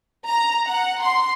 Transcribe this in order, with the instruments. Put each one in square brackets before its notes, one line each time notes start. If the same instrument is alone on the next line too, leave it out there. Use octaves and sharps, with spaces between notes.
[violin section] A#5
F#5
C6